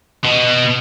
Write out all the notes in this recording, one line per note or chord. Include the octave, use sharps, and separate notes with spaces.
B2